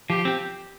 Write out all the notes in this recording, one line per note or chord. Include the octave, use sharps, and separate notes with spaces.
F3 G4
C4 G4